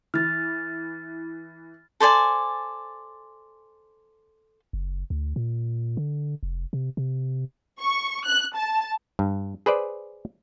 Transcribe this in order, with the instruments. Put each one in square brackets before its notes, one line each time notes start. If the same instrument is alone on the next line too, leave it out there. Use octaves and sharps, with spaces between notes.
[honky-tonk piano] E3 [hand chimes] F6 A6
[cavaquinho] A4 C5 D5 G#5
[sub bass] F#1
D2
A#2
D3
F1
C3
C3
[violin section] C#6
F#6
A5
[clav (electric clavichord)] G2
G#4 B4 C5 D5